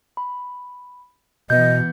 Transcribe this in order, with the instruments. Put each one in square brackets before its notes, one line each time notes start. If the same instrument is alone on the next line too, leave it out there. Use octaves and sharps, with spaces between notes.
[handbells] B5
[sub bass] B2 [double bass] E3 B3 [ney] D#5 [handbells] G6